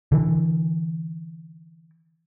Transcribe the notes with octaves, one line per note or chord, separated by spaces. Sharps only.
D3 E3